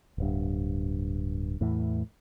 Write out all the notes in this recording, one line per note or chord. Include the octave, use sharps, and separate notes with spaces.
D1 G2
E2 A2 E3